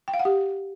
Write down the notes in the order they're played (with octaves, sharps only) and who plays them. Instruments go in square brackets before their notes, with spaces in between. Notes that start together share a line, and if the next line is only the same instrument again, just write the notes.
[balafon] G5
F5
F#5
G4